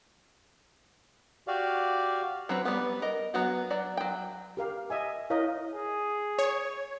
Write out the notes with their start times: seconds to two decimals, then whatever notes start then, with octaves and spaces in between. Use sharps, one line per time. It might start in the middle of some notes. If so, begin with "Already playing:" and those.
1.48 F#4 G4 D5 F5
2.49 F#3 C4 B4
2.65 G3 B3
3.02 A#4 D#5
3.34 F#3 B3 F#4
3.70 F#3 D5
3.97 F#3 G5
4.57 G4 A#4 F5
4.90 D#5 E5 G#5
5.30 E4 A#4 C#5 D#5 F5
5.74 G#4
6.39 C#5